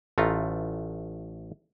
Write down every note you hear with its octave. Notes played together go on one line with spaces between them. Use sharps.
A1 A3 F4 A#5